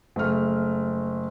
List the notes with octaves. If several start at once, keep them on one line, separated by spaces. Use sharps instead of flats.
F#1 A3 F6